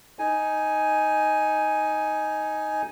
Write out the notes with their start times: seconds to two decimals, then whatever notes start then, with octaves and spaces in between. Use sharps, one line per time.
0.19 D#4 G#5